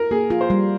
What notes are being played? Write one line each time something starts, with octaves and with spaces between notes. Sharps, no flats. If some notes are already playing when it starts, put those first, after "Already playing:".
Already playing: A#4
A#3 G#4
F4
C5
G3